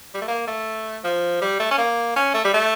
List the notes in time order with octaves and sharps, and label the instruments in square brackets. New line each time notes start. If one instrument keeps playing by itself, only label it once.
[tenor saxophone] G3
A3
A#3
A3
F3
G3
A3
C#4
A#3
C#4
A3
G3
A3